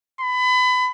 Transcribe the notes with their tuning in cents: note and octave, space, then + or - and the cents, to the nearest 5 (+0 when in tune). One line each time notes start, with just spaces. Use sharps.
B5 +25